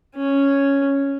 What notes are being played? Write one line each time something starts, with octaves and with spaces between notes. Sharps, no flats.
C#4